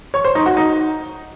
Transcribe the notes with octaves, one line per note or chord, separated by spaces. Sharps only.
C#5
C5
D#4
F#4
D#4